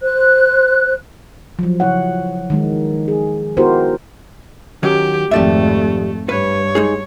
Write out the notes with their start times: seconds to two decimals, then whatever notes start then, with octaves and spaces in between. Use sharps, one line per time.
0.01 C5 F#6
1.59 F3 F#3
1.80 C#3 F3 F#3 E4 C#5 F#5
2.50 D#3 G#3 D#4
3.08 G#4
3.57 B3 E4 F#4 G4 A#4 C5
4.83 D#3 F#3 C#4 G4
5.31 G#1 F2 F3 A3 G4 D5 E5
6.29 G2 B4 C#5
6.75 G#3 D#4 G#4